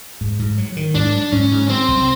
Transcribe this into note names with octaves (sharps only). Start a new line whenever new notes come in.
G#2
G#2
F#3
D#3
G#2 D4
F#3
G#2 C#4
G#2
F#3 C4
C2